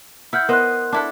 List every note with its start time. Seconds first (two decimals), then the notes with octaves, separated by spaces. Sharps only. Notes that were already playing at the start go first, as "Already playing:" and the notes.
0.33 E4 F#5 E6 F6 G6
0.49 B3 A#4 C5 D#5 C6 F#6
0.93 D4 E4 A4